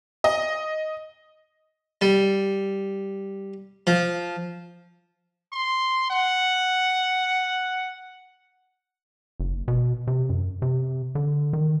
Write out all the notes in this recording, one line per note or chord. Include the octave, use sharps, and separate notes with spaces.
D#5
G3
F3
C6
F#5
F#1
B2
C3
F#2
C3
D3
D#3